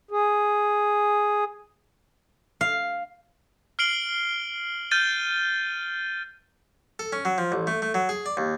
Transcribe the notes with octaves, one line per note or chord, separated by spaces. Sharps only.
G#4
F5
F6 C7 D7 F#7 G7
F6 G6 A6 D#7 G7
A4
C#4
F#3
F3
A1
A3
A3
F#3
G#4
D5
D#2